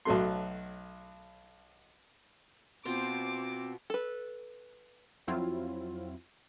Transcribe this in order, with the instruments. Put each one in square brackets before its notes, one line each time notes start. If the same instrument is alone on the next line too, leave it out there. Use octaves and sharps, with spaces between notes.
[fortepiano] B1 F#3 A3 C6
[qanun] B2 F4 C5 [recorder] C4 [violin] D6
[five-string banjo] A4 B4
[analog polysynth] F2 F#3 C4 E4 F4